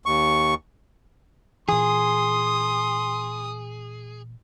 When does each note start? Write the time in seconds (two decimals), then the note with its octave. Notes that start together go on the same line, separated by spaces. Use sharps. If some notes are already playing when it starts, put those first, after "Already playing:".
0.06 D#2 C#6
1.69 A#2 E3 G#4 C6 D#6